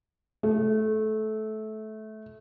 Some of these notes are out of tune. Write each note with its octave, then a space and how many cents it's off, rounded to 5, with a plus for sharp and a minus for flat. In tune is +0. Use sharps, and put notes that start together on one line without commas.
A3 -20